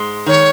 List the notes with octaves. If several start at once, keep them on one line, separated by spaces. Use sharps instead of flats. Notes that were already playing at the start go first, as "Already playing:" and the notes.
Already playing: G#2 G#3
D#3 C#5